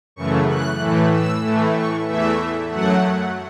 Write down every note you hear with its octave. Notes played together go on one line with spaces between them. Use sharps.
F#2 C#3 E3 A3 C#6
F#6
A2 E3 A3
E6
A2 E3 A3
C#6
E2 E3 A3 E5
F#2 F#3 A3 F#5